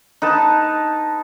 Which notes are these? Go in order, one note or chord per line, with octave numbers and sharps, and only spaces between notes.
D#4 B4 A5